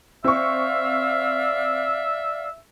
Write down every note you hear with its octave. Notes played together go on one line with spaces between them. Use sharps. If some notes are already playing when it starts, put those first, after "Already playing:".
C4 D5 E5 F5 C#6 F6